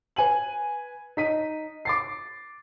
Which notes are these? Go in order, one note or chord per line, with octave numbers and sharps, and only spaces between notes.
B4 G#5 D#7 F#7
D#4 B6 D#7
D6 A6 C7